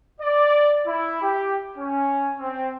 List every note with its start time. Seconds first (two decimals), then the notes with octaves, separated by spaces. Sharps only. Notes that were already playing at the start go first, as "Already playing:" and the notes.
0.20 D5
0.86 E4
1.22 G4
1.77 C#4
2.39 C4